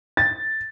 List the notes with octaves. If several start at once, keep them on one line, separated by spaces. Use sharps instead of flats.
A6